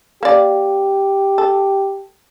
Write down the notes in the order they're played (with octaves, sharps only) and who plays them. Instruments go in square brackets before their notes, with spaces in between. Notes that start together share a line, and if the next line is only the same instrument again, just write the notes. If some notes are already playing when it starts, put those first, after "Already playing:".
[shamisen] A#3 D5 [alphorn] G4
[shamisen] A4